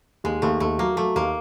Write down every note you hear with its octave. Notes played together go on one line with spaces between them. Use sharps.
D#2 G#3
D#2 A3
D#2 A3
F#3 A#3
F#3 A3
D#2 A#3